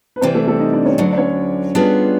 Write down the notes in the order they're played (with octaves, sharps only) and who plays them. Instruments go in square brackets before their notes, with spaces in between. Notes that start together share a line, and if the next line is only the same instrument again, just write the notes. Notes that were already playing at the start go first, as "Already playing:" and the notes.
[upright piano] B4
[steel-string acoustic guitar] C3 E3 G3 [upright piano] C4 C5
[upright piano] A3 A4
A3 A4
D#4 D#5
D4 D5
C#4 C#5
[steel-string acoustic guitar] D2 D3 F#3 [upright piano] D4 D5
[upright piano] D5
C#4 C#5
[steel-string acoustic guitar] G3 B3 D4 F4 G#4